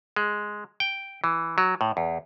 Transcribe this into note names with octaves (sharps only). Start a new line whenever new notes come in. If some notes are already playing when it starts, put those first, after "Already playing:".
G#3
G5
E3
F#3
A2
E2